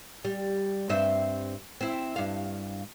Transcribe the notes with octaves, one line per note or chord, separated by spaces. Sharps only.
G3
G2 C4 E5
C4 E4
G2 F5